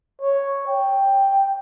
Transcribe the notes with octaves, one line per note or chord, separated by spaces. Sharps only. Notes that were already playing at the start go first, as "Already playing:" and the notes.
C#5
G5